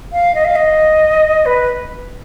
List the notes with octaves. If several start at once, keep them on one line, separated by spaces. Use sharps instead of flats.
F5
D#5
F5
D#5
B4